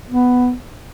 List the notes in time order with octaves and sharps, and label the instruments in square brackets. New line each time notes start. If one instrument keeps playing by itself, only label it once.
[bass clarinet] B3